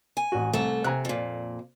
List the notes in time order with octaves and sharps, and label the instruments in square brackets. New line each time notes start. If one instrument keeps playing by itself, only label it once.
[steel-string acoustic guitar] G#5
[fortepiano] A1 F#4
[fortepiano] C2 [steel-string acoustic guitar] A3 A4
[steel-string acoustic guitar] C3 [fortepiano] G#5 A#5 F#6
[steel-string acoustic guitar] F2 A#2